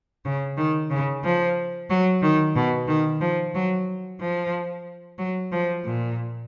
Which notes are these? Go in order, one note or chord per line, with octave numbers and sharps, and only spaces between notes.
C#3
D#3
C#3
F3
F#3
D#3
B2
D#3
F3
F#3
F3
F#3
F3
A#2